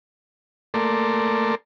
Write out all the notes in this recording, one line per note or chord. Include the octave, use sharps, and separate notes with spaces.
A3 A#3 A4 A#4 D5 C6